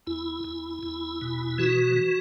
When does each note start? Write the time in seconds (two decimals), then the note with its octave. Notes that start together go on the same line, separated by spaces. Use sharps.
0.07 E2 E4
0.44 E2
0.83 E2
1.21 B2
1.58 E3 F#4
1.96 E3